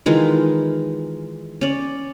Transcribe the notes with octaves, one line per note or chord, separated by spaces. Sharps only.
D#3 E3 G#3 F4
C#4 D5